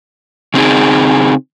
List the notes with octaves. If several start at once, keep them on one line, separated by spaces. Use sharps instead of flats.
C#3 C4 D#4 G#4